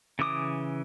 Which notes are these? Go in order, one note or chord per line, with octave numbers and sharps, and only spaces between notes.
C#3 E3 D6 D#6